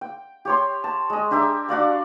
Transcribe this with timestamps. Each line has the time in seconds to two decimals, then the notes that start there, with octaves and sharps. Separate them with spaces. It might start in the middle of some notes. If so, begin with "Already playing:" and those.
0.01 G5
0.45 G4 C#5 C6
0.84 A5
1.10 G#3 D#5
1.31 D4 G4 A#4 E5
1.69 D4 F#4 D5 F5